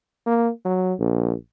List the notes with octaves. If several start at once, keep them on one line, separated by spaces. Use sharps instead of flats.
A#3
F#3
A#1